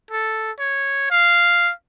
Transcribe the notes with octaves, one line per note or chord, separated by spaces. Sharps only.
A4
C#5
F5